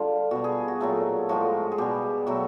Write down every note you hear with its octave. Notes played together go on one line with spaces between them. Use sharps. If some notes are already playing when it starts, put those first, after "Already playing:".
Already playing: D3 G3 F4
B2 G3 F#4
G#4
F#4
A#2 F#3 A3 F4
A2 F3 G#3 F#4
G#4
B2 G3 G4
B2 F#3 A3 F#4